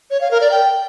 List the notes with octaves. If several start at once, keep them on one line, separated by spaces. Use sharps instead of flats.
C#5
F5
A#4
D5
G5